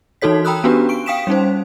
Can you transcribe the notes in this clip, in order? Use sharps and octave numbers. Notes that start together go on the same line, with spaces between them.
E3 D#4 F#4 A4 C#5 B6
G5 A#5 B5 D#6 E6 F#6
B3 C#4 D4 F#4 G4 B4
C#6 D7
F5 G5 D#6 B6 D7 E7
G3 C#4 D#4 C5